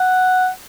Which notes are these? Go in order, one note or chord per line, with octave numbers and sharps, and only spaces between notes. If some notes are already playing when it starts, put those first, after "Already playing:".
Already playing: F#5